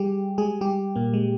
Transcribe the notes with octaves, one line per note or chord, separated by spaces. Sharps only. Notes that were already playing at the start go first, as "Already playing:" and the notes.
Already playing: G3 G4 G#4
G#3 G#4
G3 G4
A#2 A#3
G#3